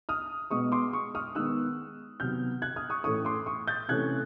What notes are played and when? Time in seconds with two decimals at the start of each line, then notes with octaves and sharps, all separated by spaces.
0.09 D#6 F6
0.51 B2 G#3 B3 C#6 D#6
0.72 C6 D6
0.93 C#6 D#6
1.15 D#6 F6
1.35 D#3 G#3 B3 E6 F#6
2.20 C3 D#3 F#3 B3 F6 G6
2.62 F#6 G#6
2.76 D#6 F6
2.90 C#6 D#6
3.04 A2 E3 A3 C#4 C#6 D#6
3.25 C6 D6
3.46 C#6 D#6
3.68 G6 A6
3.89 C3 E3 A3 C#4 F#6 G#6